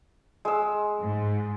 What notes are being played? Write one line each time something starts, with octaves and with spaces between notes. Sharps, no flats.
G#3 E6
G#2